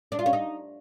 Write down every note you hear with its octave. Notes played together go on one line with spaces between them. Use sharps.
D4
F4
C#4
D#4